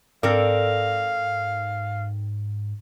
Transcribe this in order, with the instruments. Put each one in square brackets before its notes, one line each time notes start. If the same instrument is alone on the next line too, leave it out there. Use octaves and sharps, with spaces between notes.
[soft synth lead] G#2 [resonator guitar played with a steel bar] C4 A4 A#4 [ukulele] D5 [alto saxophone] F5